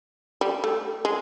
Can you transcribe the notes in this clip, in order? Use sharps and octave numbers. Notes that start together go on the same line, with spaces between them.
G3
A3
G#3